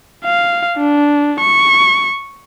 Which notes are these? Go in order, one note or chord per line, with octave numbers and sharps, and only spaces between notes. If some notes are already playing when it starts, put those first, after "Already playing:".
F5
D4
C#6